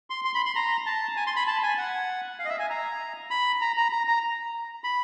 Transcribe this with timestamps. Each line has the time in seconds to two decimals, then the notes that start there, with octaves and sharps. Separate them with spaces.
0.10 C6
0.25 C6
0.35 B5
0.46 C6
0.55 A#5
0.86 A5
1.17 G#5
1.26 C6
1.36 B5
1.47 A5
1.63 G#5
1.78 F#5
2.39 F5
2.45 D#5
2.49 E5
2.59 G#5
2.70 A#5
3.30 B5
3.61 A#5
3.77 A#5
3.92 A#5
4.08 A#5
4.84 B5